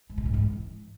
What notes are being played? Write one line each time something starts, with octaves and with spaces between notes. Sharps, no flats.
G#2
B2
G#2
E3